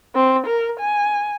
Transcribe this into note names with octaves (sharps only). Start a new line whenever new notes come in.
C4
A#4
G#5